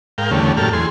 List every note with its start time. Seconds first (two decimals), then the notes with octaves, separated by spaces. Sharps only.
0.18 G#2 A#4 F5 G5
0.31 E2 D3 G3 A3 C#4
0.57 F#2 A2 A#3 G4 A4 F6
0.73 E2 G#4 C6